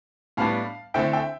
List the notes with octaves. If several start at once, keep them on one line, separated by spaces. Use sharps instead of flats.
A2 G3 B3 D4 F5 A5
D3 A3 C4 E4 E5 G5
E5 G5